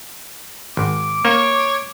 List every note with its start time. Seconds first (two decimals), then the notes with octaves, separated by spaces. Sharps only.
0.77 G#1 D6
1.25 A#3 C#5